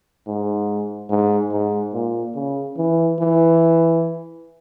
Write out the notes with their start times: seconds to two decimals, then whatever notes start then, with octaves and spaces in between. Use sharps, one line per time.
0.26 G#2
1.10 G#2
1.52 G#2
1.94 A#2
2.35 C#3
2.78 E3
3.20 E3